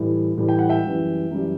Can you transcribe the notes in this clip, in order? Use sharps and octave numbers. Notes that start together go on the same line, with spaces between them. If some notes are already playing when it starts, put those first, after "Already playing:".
Already playing: A2 E3 G3
A2 E3 G3
G5
F#5
E5 G5
F#2 E3 G3
F#2 E3 G3